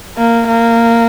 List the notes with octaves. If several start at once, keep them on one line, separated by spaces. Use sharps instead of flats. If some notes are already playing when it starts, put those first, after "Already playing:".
A#3
A#3